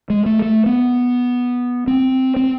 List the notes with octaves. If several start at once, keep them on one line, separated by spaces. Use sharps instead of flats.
G#3
A3
A3
B3
C4
C4